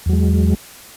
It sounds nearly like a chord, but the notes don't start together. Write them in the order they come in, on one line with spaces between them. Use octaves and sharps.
E2 F#3 G#3